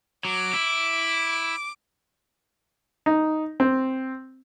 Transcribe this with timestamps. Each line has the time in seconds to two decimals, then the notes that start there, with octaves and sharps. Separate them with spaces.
0.25 F#3 D6
0.53 E4
3.06 D#4
3.60 C4